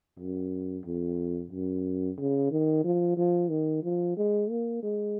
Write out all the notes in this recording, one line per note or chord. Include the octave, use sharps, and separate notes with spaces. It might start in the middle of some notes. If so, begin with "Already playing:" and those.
F#2
F2
F#2
C#3
D#3
F3
F3
D#3
F3
G#3
A#3
G#3